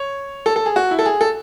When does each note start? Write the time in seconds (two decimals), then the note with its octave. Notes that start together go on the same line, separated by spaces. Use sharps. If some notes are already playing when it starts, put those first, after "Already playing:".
Already playing: C#5
0.46 A4
0.56 A4
0.66 G#4
0.76 F#4
0.91 E4
0.99 A4
1.06 G#4
1.21 A4